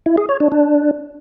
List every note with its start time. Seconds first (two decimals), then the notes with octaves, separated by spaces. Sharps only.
0.06 E4
0.17 G#4
0.29 C#5
0.40 D4
0.52 D4